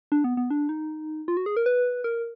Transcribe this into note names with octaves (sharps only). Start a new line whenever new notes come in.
D4
B3
B3
D4
D#4
F4
F#4
G#4
A#4
B4
A#4